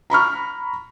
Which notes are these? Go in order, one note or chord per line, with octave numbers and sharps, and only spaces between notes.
A#5 B5 C#6 F6